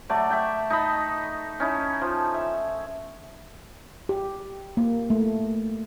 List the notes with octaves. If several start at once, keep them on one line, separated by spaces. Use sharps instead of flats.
F#3 A3 D5
E5 G5
D#4 A4 D#5 B5
C#4 D#4 E4
F3
E5
G4
A#3
A3